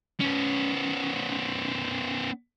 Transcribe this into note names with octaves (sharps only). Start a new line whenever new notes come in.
B3 C#4